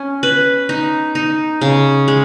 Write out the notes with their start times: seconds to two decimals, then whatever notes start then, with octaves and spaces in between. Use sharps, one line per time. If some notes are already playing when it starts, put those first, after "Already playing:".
Already playing: C#4
0.23 B4
0.69 D#4
1.15 D#4
1.61 C#3
2.08 G#3